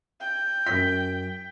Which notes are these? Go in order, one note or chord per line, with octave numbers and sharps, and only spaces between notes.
G5
F#2 B6